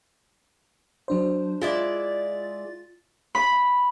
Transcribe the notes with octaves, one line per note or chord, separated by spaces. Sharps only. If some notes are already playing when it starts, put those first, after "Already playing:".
F#3 D4 C5
G#3 E4 F4 D5 A6
B5